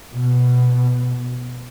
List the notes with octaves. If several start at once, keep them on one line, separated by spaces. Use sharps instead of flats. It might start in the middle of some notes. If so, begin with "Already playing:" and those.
B2